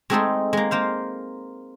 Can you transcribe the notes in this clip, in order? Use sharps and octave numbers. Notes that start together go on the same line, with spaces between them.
G#3 A3 C4 D#4 G#4 A4
G#3 A#3
A#3 C5 F5